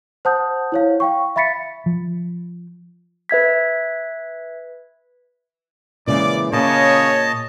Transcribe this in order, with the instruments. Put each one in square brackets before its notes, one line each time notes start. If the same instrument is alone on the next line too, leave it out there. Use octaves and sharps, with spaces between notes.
[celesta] C5 F#5 A5 D#6 G6
E4 C#5 F5
F5 G5 C#6
E5 F5 B5 A6 B6 C#7
[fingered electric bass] F3
[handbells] B4 E5 G#6 B6
[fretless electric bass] A#2 C#3 G#3 [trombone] E3 [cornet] D5 [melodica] D6
[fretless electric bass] A#2 [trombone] C#3 [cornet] C#5 [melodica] D#5 A5